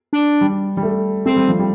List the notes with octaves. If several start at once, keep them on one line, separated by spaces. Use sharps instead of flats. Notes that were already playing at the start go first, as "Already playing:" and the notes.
D4
G3
G3
A3
A3 C4
G3
F3
G3